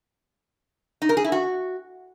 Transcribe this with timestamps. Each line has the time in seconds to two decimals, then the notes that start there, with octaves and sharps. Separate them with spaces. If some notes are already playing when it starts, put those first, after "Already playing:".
1.02 D#4
1.09 A#4
1.17 G#4
1.24 E4
1.32 F#4